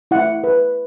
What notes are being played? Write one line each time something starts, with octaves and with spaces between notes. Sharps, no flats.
E4 F#5
B4